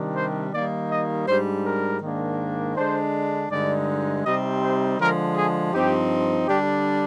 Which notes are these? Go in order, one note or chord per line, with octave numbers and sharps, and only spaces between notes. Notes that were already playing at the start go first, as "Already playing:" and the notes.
Already playing: C3 D#3 G3 D4
C5
D#3 G3 A#3 D#4 D5
D#5
G#2 G3 D4 C5
A#4
G#2 D#3 A#3 D4
D3 G#3 D4 C5
G2 D3 G#3 D#4 D5
C3 G3 C4 D#4 D#5
C5
D3 F3 G#3 A#4
G#4
G2 F3 C4 D#4 G4
D3 G3 D4 G4